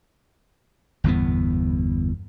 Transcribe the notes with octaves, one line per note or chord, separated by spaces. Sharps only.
G1 E2 A2 B3